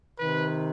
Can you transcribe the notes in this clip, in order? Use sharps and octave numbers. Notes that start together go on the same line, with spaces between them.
C3 D#3 B4